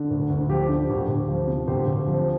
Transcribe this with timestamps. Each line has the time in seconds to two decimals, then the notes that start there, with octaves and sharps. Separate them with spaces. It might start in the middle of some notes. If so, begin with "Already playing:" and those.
Already playing: D3
0.10 D2
0.30 D2
0.49 F3 G4
0.68 D3
0.89 D2 G4
1.08 D2
1.29 F3
1.47 C3
1.67 D2 G4 C5
1.87 D2
2.06 F3